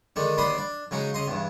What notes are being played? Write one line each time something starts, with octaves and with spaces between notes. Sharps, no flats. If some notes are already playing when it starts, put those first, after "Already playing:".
D3 D#3 G#3 D4
D#2 D3 D4 B5 C6 D#6
D4
C#3 F#3 G#3 D#4
C#3 D#5 C6
E2 G2